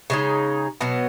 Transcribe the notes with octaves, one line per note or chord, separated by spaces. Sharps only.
C#3 G#3 D#4
B2 F#3 B3